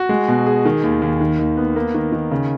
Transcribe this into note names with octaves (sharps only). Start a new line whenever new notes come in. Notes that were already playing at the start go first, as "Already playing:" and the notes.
Already playing: F#4
G#3
B2
G#4
D#3
D#2
D#2
D#3
D#2
B3
A#3
D#3
D#3
C#3